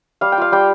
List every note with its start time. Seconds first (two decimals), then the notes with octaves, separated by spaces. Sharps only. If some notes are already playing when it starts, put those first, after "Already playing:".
0.21 G3 F5
0.32 G5
0.38 F4 F5
0.52 G3 G5